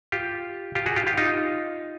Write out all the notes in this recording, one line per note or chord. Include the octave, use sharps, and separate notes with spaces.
F4 G4
F4 G4
F#4 G#4
F4 G4
F4 G4
D#4 F4